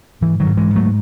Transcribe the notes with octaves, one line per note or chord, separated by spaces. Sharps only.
G#2 E3
D#3 F#3
G#2
E3 G#3
G#2
F#3 A3